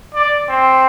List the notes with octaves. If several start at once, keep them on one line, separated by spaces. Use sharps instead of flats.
D5
C4